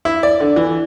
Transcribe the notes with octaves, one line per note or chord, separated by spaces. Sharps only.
E4
D5
D3
E3